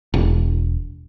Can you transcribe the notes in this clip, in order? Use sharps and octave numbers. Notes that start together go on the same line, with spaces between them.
E1